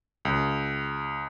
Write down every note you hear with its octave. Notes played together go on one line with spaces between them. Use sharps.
C#2